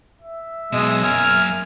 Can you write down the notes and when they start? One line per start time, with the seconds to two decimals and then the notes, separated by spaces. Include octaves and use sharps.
0.22 E5
0.73 B1 B2 G#3 D#5
1.03 F#2 A#3 G#5 F6